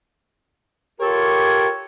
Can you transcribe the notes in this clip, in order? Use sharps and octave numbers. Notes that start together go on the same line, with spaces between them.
F4 G4 A4 A#4 C#5